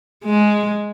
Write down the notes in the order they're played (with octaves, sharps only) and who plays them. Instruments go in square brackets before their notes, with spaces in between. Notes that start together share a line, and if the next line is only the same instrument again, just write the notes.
[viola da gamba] G#3